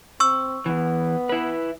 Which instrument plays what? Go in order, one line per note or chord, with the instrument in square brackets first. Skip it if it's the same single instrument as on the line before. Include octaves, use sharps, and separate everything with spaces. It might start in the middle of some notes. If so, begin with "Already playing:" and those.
[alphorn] C4 [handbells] C#6 E6
[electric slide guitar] E2 E3 [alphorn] B3
[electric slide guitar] E4 B4